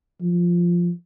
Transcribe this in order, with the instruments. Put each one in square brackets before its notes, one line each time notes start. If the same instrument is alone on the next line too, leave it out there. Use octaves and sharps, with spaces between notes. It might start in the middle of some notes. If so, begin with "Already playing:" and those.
[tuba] F3